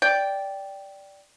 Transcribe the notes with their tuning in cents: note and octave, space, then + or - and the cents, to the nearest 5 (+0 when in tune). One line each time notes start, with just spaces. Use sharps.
D5 -10 G5 +0